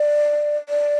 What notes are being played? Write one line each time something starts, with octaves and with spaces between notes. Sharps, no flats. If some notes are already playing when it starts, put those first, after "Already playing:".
Already playing: D5
D5